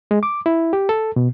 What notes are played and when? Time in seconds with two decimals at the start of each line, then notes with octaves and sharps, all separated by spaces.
0.11 G#3
0.23 D6
0.46 E4
0.73 G4
0.89 A4
1.16 B2